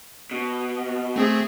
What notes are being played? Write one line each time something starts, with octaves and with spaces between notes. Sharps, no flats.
B2
A3 C4 G#4